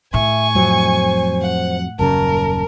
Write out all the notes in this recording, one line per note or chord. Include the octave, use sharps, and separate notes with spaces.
A2 E5 G#5 C#6
F2 F#3 C5
F#5
D#1 F#2 C#3 A#4 A5